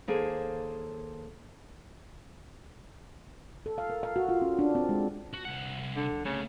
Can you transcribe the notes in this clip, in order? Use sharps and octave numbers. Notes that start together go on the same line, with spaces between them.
D#2 A#3 G#4 A4 C5
A4
F5
A#4
F5
F#4
F4
C#4
D4
C4
G#3
F#4
C2 F#5
D3
C#3 A3 A#3